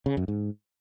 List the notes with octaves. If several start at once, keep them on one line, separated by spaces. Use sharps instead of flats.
C#3
F#2
G#2